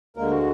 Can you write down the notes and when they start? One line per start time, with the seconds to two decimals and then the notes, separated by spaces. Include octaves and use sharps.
0.16 D2 D3 G#3 A#3 A#4
0.31 F#4